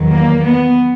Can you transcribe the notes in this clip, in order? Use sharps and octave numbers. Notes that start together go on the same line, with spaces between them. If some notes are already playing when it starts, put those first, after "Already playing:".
Already playing: E2 D#3 F#3
A#3
B3